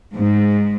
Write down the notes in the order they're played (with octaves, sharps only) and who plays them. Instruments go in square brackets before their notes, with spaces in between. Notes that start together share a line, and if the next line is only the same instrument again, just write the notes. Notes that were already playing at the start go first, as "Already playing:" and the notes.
[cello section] G#2